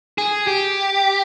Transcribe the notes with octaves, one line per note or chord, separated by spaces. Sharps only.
G#4
G4